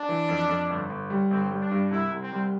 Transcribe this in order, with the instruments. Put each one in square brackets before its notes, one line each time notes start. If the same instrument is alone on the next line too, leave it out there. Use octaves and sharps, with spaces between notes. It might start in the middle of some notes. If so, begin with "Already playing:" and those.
Already playing: [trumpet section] D4
[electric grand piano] E3
F2
F2
G1
G1
G3
[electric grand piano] G1 [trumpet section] C4
[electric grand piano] G3
[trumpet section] D4
[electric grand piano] G2
[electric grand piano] C2 [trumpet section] E4
[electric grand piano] C2
[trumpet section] C4
[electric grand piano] G3